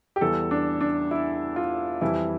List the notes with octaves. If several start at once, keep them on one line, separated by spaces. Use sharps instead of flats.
G4
E2 E3 G3 A4
D4
D4
E4
F4
F2 E3 G3 E4